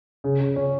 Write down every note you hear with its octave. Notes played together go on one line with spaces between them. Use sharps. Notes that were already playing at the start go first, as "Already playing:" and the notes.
C#3
C#3
C#4